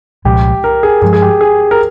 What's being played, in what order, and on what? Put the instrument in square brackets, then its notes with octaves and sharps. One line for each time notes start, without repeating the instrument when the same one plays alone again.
[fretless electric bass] C2 A#2 F3 G#3 [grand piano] G4
[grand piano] A#4
G#4
[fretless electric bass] G2 F3 G#3 [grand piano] G#4
[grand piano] G#4
G4
G#4
A#4